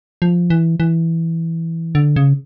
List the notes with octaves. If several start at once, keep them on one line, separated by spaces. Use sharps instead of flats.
F3
E3
E3
D3
C#3